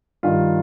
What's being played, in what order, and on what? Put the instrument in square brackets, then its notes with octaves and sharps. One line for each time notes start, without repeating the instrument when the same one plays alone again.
[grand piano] G2 D#3 F4